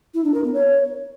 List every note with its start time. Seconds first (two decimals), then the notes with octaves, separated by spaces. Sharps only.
0.14 E4
0.24 D4
0.34 A#4
0.44 B3
0.54 C#5